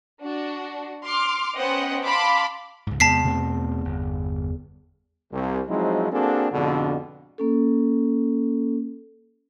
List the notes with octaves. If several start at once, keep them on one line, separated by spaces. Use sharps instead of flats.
D4 F#4
C6 D6 F6
B3 C#4 C5 D#5 F#5 G5
F5 A5 B5 C6 D6
C#2 G#2
E2 C3 G#3 B3 A5 B6 C7
B2 A3 C4
G1
C2
F3 F#3 G#3 C4 D#4 E4
A#3 C4 D4 F#4 G#4 A4
F2 G#2 B2 D3
A#3 C#4 A4